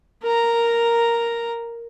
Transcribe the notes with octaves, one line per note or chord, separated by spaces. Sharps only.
A#4 A#5